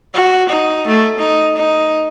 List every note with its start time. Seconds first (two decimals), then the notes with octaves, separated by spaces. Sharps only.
0.14 F#4
0.49 D#4
0.87 A3
1.19 D#4
1.57 D#4